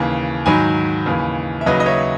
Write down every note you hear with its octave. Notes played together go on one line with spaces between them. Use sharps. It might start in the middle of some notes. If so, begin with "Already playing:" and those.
Already playing: D#2 C#3 E3
G#2 D#3 F#3 G#5 B5
D#2 C#3 E3
E5
D#2 C#3 F#3 B4 D#5
D#5
C#5 E5